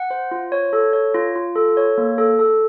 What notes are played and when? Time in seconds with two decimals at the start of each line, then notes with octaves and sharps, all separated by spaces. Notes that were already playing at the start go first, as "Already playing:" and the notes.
Already playing: F#5
0.10 C5
0.31 F4
0.52 C#5
0.73 A4
0.93 C#5
1.14 F4
1.36 F4
1.56 A4
1.77 C#5
1.98 A#3
2.18 A4
2.39 A4